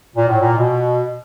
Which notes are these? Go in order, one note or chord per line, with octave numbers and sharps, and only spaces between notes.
A#2
A2
A#2
B2